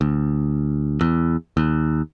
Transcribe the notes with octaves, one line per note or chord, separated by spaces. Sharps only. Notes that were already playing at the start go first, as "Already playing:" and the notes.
D2
E2
D#2